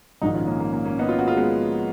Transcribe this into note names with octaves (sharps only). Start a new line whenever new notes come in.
A#1 G#2 D#3 D#4 F#4
C#4 F4
A#3 C#4
A#3
A#3
A#3 C#4
B3 D#4
C#4 F4
D#4 F#4
F4 G#4
G#3 B3